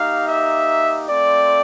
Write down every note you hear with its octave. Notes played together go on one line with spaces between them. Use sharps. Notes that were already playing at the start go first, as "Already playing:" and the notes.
Already playing: A#3 D#4 G4 F5
E5
A3 C4 F4 D5